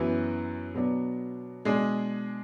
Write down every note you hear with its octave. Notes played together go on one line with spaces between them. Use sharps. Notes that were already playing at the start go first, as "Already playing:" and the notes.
Already playing: F#2 E3 B3 F#4
B2 F#3 B3 D4
B2 G#3 D4 G#4